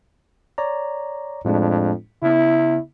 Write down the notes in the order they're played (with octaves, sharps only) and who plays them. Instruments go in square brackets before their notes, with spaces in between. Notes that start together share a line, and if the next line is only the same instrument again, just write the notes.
[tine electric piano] C#5 D5 A#5
[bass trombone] F2 [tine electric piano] A2 G#3 D4
[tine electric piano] C#3 B3 [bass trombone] E4